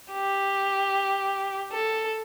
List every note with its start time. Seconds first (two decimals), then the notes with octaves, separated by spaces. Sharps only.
0.12 G4
1.72 A4